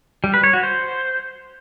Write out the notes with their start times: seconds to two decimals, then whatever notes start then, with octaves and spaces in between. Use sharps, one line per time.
0.24 G3
0.34 B4
0.44 C#5
0.53 F#4
0.63 C5